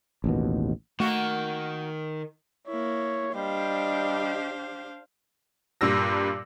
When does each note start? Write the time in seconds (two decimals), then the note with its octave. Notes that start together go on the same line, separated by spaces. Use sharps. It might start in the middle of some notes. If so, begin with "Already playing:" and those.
0.24 A1 D#2 B2
1.00 D#3 A3 A#3 F#4
2.67 A#3 E4 C#5
3.34 G3 D4 G4 C5 D#5 F5
5.81 G2 A#2 G3 E6 A#6